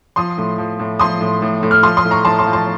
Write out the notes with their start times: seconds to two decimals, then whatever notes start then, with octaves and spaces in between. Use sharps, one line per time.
0.16 F3 C6 D#6
0.38 A2
0.58 F3
0.79 A2
0.99 F3 C6 D#6
1.21 A2
1.42 A2
1.63 A2
1.71 F6
1.83 F3 C6 D#6
1.97 C6 D#6
2.05 A2
2.11 A#5 C#6
2.25 A2 A5 C6
2.39 A5 C6
2.46 F3
2.53 A5 C6